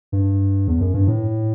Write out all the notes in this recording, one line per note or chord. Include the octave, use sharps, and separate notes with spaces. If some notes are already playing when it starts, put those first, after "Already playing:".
G2
E2
F#2
G2
A2